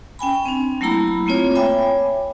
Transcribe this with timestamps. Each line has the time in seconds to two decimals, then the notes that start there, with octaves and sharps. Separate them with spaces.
0.19 C#4 G5 G#5 B5
0.46 C4 D4
0.81 F#3 A3 A#3 E4 A#5 B5
1.26 A3 A#3 C4 F4 C#5
1.55 C#5 E5 G5 G#5 B5 D6